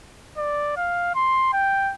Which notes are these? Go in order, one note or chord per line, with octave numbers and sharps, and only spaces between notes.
D5
F5
C6
G5